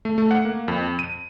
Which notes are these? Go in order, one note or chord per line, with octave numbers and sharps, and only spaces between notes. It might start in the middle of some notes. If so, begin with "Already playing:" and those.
A3
A3
F#5
A#3
F2
D#7